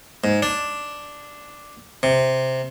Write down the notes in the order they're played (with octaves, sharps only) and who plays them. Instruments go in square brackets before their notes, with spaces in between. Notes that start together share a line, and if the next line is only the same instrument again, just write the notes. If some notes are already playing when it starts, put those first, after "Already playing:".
[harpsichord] G#2
D4
C3